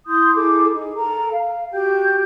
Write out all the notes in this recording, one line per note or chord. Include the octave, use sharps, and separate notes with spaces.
E4 C6 D#6 G6
E4 G#4 A4 D6
D#4 G#4
A4 A#4 A#5
F5
F#4 G4 G5 G6